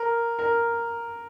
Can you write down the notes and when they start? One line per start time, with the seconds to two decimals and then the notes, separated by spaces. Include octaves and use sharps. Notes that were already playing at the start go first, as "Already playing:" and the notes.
Already playing: A#4
0.39 A#4